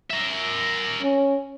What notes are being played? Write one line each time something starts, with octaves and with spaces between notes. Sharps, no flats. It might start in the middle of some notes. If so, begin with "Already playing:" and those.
A#4 E5
C#4